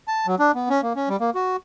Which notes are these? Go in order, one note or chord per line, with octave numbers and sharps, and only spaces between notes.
A5
F#3
D4
B3
C#4
A#3
C#4
G3
A#3
F#4